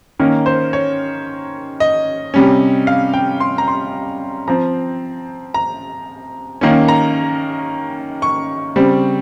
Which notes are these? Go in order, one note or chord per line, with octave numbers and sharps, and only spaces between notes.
D#3 A#3 C#4 A#4
C5
C#5
D#5
C3 G3 C#4
F5
G5
C6
A#5
C6
F3 C4 A#5
A#5
D#3 A#3 C#4
A#5
C#6
C#3 G3 C4